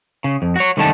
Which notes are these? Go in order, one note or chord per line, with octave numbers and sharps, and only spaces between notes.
C#3
F2
F#4 C#5
C2 D3 D#3 A3 C#4 A5